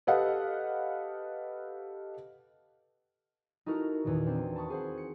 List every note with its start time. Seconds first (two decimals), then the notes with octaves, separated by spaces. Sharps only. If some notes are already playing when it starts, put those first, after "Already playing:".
0.07 G4 A4 B4 D#5 F5 F#5
3.66 D#4 E4 F#4 A4 A#4
4.04 E2 A#2 D#3
4.26 C4 D4 C5
4.56 A5 B5 C#6 D#6
4.70 G#4 C5 F#5
4.98 C#7